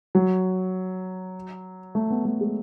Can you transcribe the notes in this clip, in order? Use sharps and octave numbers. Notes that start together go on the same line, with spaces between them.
F#3
A3
B3
A3
G#3